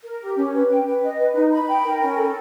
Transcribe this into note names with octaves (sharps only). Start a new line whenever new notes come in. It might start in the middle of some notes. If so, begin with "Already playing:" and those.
A#4
G4
C#4
B4
G5
B4
D#5
B4
D#4
B5
G5
A#4
C#4
A4